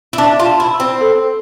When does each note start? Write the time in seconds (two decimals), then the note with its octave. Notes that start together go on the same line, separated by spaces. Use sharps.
0.13 E4
0.18 D4 E5
0.40 F4
0.45 A5
0.60 E4
0.74 E6
0.80 C4
1.01 A4